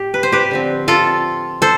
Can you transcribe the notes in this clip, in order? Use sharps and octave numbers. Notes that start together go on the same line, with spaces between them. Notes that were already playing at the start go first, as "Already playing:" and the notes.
Already playing: A2 G4
B4
C5
G4 B4
D3 F3 C4
F4 A4
A4 C5